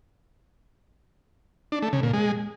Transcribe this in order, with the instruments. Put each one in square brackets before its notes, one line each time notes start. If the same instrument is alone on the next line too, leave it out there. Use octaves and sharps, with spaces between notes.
[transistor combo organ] D4
A3
C#3
A#2
G#3